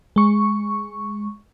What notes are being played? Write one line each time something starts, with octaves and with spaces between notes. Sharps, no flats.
G#3 C#6